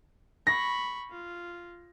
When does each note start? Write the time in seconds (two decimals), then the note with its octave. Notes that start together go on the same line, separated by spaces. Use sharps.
0.47 B5 C#6 A#6
1.10 F4